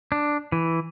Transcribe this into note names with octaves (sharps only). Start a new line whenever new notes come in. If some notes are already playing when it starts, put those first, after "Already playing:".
D4
E3